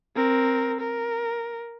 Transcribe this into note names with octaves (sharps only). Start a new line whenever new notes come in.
C4 A#4
A#4